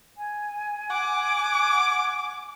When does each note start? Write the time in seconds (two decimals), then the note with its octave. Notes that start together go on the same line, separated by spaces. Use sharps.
0.17 G#5
0.90 F#5 D6